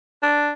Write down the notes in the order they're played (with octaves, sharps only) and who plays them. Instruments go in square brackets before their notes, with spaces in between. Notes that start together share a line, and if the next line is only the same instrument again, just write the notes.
[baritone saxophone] D4